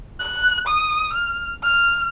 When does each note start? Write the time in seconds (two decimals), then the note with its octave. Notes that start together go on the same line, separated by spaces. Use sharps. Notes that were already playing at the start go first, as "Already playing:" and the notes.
0.20 F#6
0.67 D#6
1.13 F6
1.63 F6